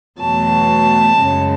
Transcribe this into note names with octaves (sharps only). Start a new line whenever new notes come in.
E2 B2 F#3 A3 A5
F#2 C#3 G#3